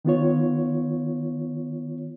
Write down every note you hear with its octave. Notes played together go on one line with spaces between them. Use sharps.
D#3 B3 F4 C#5